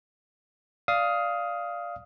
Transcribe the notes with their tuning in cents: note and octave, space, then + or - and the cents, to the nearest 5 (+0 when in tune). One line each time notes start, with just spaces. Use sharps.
D5 +0 F5 -5 D#6 +15